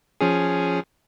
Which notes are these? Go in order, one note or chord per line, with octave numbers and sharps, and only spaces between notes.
F3 C#4 G#4